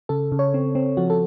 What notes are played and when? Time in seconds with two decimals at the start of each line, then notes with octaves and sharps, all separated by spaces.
0.09 C#3 A4
0.32 C#3
0.39 C#5
0.54 C4
0.75 C4
0.97 F3 F#4
1.10 A4